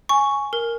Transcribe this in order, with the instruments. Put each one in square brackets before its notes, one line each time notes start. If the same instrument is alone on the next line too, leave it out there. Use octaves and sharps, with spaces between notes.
[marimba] G#5 [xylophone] C#6
[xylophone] A#4